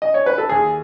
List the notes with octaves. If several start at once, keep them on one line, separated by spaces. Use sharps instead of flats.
D#5
C#5
B4
A4
D#2 G#4